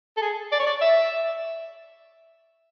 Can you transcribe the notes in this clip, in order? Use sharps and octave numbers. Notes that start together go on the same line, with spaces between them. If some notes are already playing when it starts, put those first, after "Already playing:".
A4
G#4
D5
C#5
D5
E5